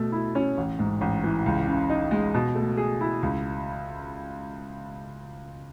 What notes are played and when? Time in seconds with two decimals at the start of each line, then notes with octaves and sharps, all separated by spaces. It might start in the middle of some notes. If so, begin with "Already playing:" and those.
Already playing: B2 A3
0.12 E4
0.35 C#4
0.57 A1
0.79 G#2
1.01 A1
1.23 E3
1.46 C#2
1.68 C#3
1.90 D#4
2.11 G#3
2.34 B2
2.55 A3
2.77 G#4
3.01 E4
3.23 C#2